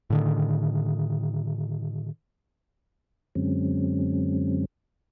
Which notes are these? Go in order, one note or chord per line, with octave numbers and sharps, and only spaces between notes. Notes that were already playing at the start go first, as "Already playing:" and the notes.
A2 D3 D#3
F#2 D3 F#3 G#3 C4 C#4